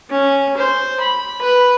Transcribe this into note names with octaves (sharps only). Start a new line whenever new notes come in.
C#4
C5
B5
B4